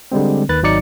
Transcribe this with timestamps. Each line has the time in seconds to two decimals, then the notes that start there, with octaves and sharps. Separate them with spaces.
0.12 D3 G3 G#3 C4
0.49 D#2 D#3 B4 F#6 A6
0.63 G#1 F#3 D#4 D5 C#7